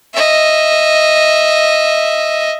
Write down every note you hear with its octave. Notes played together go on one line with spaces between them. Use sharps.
D#5 E5